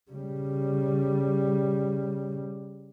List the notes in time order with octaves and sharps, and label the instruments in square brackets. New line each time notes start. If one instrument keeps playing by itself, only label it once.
[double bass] C#3 G3